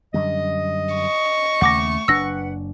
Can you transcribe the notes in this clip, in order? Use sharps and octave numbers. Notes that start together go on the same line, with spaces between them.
F#2 D3 G3 D#5
C#6
D#2 C#3 A3 F#5 D6 A#6
F#1 D4 B4 F#5 E6 A#6